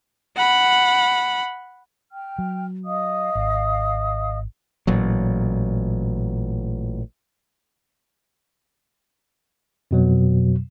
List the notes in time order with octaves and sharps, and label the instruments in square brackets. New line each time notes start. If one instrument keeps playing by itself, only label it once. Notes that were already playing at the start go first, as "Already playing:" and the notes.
[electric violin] F#5 B5
[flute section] G5 F6
[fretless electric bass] F#3
[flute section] D#5 F5 D#6
[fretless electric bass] G#1
[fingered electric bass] A1 A#2 F#3
[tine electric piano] F2 B2 F#3